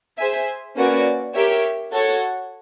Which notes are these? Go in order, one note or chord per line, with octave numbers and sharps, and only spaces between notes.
G#4 C5 E5 G#5
A#3 C#4 F#4 B4 D5
G4 A#4 C#5 E5
F#4 A4 C#5 F#5